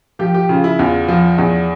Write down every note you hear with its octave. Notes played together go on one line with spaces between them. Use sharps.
F3 G4
G4
C#3 F4
E4
E2 F4
F3
E2